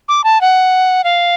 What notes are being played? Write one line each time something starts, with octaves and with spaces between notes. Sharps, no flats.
D6
A5
F#5
F5